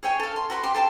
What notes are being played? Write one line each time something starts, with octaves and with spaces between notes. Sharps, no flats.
G#4 C#5 G5 G#5
A4 F5
C6
F#4 B5 C6
G4 C6
A4 G5 A5 C6